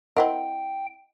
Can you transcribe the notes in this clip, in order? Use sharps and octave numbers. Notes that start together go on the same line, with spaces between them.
C4 E4 A#4 D#5 F#5 G5